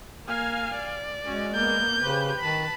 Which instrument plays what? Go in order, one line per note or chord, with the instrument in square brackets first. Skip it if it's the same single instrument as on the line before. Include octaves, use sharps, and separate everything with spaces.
[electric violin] A#3 [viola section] F5 G#5
[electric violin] D5
[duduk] G#3 [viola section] C#4 F#4
[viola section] A#3 B3 [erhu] G6
[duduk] C#3 [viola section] G4 B4 C5
[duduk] D#3 [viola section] B4 A5 [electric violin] B5